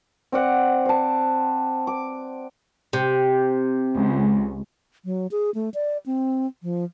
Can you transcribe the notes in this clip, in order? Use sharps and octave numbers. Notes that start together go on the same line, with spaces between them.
C4 D5 F#5
C5 A5
D6
C3
C#2
F#3
G#4
A3
D5
C4
F3